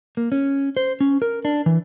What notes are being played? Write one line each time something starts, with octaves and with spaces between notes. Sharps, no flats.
A#3
C#4
C5
C#4
A#4
D4
E3